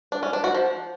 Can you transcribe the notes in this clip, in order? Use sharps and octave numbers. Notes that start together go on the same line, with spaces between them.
D4
C#4
D4
F#4
F3